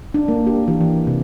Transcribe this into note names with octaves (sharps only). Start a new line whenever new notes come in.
D4
A#3
G4
E3
E3
C3